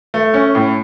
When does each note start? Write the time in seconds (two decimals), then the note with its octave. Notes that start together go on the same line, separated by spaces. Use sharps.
0.14 A3
0.34 C#4
0.55 A2